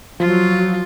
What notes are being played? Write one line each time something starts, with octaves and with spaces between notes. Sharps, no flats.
F3 F#3 F4